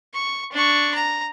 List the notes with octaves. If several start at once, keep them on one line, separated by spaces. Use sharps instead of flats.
C#6
D4 C#6
A#5